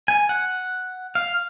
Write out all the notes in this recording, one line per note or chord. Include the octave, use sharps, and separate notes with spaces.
G#5
F#5
F5